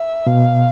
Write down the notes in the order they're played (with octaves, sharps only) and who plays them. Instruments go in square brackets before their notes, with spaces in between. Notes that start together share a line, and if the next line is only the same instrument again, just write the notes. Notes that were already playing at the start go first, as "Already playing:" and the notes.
Already playing: [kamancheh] E5
[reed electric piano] B2 [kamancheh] F5